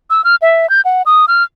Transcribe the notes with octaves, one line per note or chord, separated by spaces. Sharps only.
E6
F6
E5
G6
F#5
D#6
F6